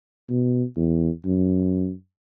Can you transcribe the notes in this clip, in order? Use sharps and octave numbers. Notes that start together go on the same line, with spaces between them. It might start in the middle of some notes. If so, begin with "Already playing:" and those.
B2
E2
F#2